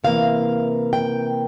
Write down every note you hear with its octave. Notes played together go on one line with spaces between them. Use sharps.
C3 E3 A#3 F5
G5